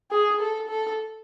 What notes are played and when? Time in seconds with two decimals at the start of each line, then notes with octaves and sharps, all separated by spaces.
0.11 G#4
0.40 A4
0.69 A4